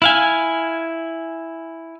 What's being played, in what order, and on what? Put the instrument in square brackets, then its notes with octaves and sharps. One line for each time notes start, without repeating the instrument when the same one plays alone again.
[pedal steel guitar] E4 F5 G#5